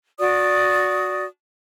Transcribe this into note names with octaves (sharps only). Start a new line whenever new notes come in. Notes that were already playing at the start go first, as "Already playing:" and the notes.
F#4 D5 D#6